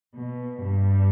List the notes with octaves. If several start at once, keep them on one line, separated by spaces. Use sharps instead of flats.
B2
G2